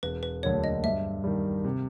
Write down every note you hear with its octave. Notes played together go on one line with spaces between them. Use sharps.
E1 B4
B4
D2 D3 F#3 A#3 C#5
D#5
G2 E5
D#3 G3
C3